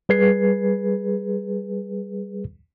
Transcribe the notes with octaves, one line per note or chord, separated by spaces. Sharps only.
G3 G#4 B4 G#6 C7